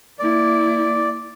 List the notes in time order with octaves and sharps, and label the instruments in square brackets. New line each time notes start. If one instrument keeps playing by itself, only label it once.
[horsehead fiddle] A#3 E4 [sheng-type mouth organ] D5